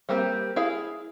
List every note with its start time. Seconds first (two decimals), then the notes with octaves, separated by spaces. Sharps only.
0.09 G3 A#3 C4 G4
0.56 E4 G#4 F5